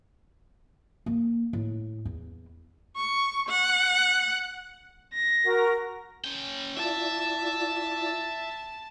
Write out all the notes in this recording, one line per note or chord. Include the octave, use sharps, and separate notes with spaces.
A#3
A2
E2
C#6
F#5
A#6
F#4 A#4
C#4 G5
E4 F4 D5 E5 A5